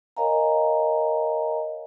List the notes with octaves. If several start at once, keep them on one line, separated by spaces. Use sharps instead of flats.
A#4 C#5 D#5 F5 G#5 A#5